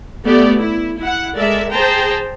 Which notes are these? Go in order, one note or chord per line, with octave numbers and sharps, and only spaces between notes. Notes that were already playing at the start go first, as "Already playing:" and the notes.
A3 B3 G4 D5
E4
E4 F#5
G#3 A4 A#4 D5 E5
G#4 C5 G5 A5 A#5